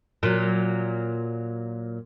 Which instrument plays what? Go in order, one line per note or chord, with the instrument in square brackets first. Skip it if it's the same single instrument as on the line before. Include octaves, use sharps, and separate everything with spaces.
[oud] A#2 F#3